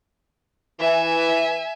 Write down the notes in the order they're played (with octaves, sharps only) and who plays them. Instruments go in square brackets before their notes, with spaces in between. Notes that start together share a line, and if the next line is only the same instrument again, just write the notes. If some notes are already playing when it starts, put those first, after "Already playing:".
[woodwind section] E3 [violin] E5 G#5